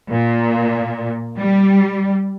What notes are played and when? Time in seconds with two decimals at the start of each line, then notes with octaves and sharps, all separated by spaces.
0.10 A#2
1.38 G3